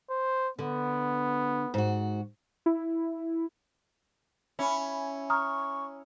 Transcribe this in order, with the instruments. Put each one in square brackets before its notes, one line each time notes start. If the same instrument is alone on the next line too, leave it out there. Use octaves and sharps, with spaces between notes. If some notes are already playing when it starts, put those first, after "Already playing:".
[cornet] C5
[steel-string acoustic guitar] D3 [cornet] B3
[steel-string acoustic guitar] G#2 F#4
[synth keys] E4
[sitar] C#4 [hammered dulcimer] E4 B5
[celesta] A#5 D#6 F6 [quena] C#6